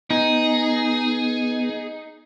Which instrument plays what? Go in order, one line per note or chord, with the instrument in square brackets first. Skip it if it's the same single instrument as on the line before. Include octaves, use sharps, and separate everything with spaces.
[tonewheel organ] B3 [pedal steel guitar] D#4 [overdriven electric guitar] G#4